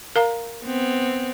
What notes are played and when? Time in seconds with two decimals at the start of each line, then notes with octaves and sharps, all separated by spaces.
0.16 A#4 F5 A#5
0.64 B3 C4